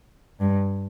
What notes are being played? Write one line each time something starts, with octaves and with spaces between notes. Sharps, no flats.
G2